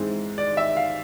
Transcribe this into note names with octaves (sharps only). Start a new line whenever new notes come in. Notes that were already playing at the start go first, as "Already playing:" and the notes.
Already playing: G#2 E3 G#3 C4
D5
E5
F5